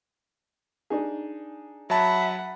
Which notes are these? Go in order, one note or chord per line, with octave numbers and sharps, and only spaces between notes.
D4 D#4 G#4
F#3 E5 F#5 A5 B5